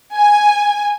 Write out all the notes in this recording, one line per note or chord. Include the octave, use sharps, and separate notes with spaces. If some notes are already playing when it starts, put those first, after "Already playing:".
G#5